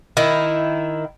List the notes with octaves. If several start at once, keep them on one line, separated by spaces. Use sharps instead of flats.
D#3 E4